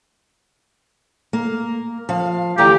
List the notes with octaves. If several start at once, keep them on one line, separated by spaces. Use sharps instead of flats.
A#3
F3 F5
D2 E3 G4 A#5